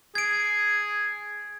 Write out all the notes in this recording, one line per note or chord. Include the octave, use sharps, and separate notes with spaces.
G#4 G#6 D7